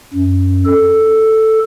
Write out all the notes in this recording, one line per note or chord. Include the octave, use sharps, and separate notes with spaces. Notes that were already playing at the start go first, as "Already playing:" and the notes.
F#2
A4